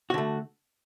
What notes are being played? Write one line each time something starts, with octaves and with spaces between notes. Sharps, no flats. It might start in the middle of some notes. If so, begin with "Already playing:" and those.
D3 A3 F#4